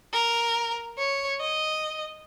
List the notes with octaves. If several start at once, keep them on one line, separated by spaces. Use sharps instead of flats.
A#4
C#5
D#5